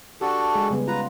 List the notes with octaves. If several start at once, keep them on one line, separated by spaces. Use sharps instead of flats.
D4 F#4 G4 A4
G#3 G#4
C#3 G3 B3
F4 B4 A#5